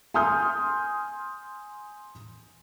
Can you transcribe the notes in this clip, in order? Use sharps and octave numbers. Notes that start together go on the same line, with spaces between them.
G#5 C6 D#6 F6 G6